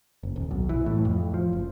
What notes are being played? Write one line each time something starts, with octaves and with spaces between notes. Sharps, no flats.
F#1
D#1
B1
E3
A2
F2
F3
F#1